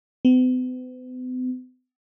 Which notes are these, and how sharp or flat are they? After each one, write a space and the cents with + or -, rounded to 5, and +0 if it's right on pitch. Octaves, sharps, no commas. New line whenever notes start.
B3 +45